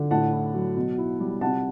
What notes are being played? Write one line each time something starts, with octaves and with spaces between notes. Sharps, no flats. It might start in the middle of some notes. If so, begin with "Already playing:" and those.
Already playing: D3
A2 F#5 A5
E4
F#3
B2
E4
G3
C3 F#5 A5